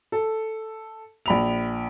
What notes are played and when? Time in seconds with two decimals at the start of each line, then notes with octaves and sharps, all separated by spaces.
0.12 A4
1.26 A#1 B5 F7